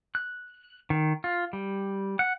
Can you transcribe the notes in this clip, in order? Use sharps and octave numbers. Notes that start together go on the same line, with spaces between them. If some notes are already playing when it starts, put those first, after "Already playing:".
F#6
D#3
F4
G3
F#5